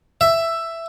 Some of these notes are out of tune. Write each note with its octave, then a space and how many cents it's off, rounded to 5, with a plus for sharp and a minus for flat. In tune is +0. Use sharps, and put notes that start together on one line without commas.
E5 +10